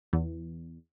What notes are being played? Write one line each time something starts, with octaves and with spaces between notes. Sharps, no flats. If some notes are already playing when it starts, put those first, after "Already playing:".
E2